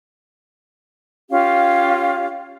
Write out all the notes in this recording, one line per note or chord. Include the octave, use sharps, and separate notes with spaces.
C#4 F4 G4 F5